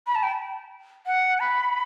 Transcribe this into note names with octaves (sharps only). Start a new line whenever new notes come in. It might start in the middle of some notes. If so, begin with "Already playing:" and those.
B5
A5
G5
F#5
B5